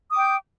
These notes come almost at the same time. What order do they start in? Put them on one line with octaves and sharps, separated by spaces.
D#6 D6 G5 G6